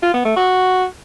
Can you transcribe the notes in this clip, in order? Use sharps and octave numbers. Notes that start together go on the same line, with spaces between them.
F4
B3
A3
F#4